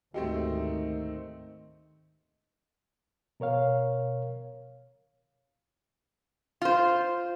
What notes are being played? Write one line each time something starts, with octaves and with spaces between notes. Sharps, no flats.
D2 G#2 D#3 A3 C4 D#4 F#4 G4
B2 A#4 C#5 F5
F4 C5